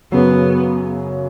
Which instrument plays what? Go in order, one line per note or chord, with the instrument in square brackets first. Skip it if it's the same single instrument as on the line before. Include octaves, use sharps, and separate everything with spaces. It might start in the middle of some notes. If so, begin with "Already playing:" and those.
[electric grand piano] F#2 C#3 F#3 [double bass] B3